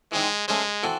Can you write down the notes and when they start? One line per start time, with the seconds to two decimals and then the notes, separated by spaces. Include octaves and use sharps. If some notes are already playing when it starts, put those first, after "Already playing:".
0.12 E3 G#3 C4 D#4
0.47 G#3 A3 C#4 G#4 C5
0.83 E3 C4 F#4 A4